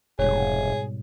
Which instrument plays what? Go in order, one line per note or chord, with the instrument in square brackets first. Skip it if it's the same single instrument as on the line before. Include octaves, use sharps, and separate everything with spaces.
[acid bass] F1 [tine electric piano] G#2 B2 G3 [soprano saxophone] G#4 [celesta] C#5